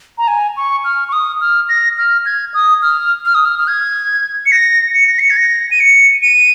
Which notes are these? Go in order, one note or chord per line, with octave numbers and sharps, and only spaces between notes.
A#5
G#5
C#6
F6
C#6
D#6
F6
A#6
F6
G#6
D#6
F6
F6
D#6
F6
F6
G#6
C#7
A#6
C#7
A#6
C#7
G#6
A#6
D#7
C#7
D#7